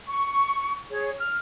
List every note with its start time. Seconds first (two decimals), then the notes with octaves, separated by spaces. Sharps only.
0.09 C#6
0.90 G#4 C#5
1.18 F6